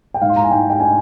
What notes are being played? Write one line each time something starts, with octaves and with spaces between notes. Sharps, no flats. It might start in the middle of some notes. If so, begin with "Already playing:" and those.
G5
G#2 F5
C6
A#5
G#5
G#2 G5
G5
D4 G#5